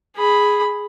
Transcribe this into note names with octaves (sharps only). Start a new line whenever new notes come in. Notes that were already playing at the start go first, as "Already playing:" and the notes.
G#4 B5